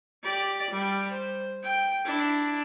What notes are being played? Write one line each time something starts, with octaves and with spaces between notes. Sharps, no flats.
G4 D5
G3
C5
G5
D4 E4